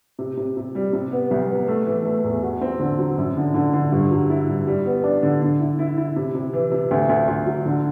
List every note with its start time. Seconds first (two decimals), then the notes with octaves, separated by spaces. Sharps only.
0.19 C3
0.37 C3
0.57 C3
0.75 G3
0.93 C3
1.12 B3
1.31 C2
1.49 B3
1.68 A3
1.87 E3
2.05 A3
2.24 E2
2.43 F#4
2.61 C4
2.80 D3
2.99 F#3
3.18 F#2
3.37 D3
3.54 D3
3.73 D3
3.92 G2
4.11 F#3
4.30 E4
4.48 G2
4.67 G3
4.86 B3
5.04 D4
5.23 D3
5.42 D3
5.60 E4
5.79 E4
5.98 E4
6.16 C3
6.35 C3
6.53 E3
6.72 C3
6.91 D2
7.09 D2
7.28 D2
7.46 F#3
7.66 D3